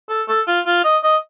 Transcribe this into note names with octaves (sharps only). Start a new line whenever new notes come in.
A4
A4
F4
F4
D#5
D#5